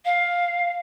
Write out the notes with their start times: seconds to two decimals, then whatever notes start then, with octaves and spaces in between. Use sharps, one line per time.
0.05 F5